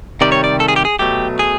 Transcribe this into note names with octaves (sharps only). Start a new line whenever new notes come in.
C3 D#3 G3 D5
C#5
D5
A4
G#4
G4
G#4
B2 F#3 A3 G4
G#4